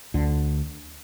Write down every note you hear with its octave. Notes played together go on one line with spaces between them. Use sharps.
D2 D3